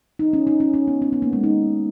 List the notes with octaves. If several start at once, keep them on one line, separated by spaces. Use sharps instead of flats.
D#4
C#4
D#4
C#4
C#4
B3
C#4
B3
A#3
G#3
D#4